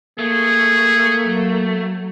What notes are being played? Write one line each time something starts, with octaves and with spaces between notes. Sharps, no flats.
A3 A#3 G#4
F#3